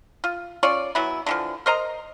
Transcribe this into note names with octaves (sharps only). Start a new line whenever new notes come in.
F4
C#4 F4 C#5 D5
E3 F#3 B3 E4
D3 E3 F3
A#4 C5 D#5 A#5